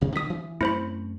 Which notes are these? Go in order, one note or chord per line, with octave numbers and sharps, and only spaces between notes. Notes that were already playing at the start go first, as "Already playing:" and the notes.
A1 D2 C3
D3 C4 D#6 B6
E3
F#2 A3 C4 E4 C5 B5